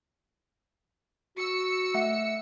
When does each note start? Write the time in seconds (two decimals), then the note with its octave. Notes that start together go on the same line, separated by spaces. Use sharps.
1.37 F#4 E6 C#7
1.94 A3 E5 F#5